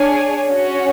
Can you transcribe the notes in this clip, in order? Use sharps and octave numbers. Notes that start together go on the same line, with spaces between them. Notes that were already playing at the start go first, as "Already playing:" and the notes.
Already playing: D4 G#4 C#5 G#5
C#4 F#4 C#5